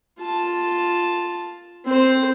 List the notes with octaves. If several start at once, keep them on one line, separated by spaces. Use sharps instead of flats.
F4 A5
C4 C5